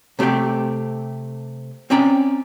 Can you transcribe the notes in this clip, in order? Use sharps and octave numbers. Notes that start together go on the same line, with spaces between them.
C3 A3 C4 G4 G5
C4 C#4 D5 G5 A#5